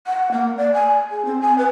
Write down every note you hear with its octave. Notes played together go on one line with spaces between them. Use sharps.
F#5
A#3
D5
G#5
G#4
C4
G#5
B4